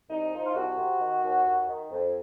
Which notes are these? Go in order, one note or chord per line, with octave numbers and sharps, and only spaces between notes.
C2 D#4
F3
F4
C2 F#4
C3
D#3
D#2
D#2
D#3
F2